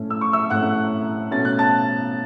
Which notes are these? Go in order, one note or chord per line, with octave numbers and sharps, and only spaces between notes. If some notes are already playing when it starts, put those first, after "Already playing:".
Already playing: A2 A3 C#4 C#5
E6
C#6
E5 E6
A2 A3 C#4 F#5 F#6
B2 A3 C#4 A6
F#6
A5 A6